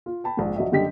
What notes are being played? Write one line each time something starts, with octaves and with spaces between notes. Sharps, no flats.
F4
G5 A5 B5
A#1 G#2
A#1 F#3 F#4 D#5 E5
F#2 D3 G3 G4 D#5 B6